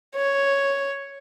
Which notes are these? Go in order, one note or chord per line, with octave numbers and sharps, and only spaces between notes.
C#5